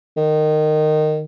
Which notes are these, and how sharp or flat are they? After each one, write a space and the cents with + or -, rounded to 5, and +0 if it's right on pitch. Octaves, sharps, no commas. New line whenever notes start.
D#3 -20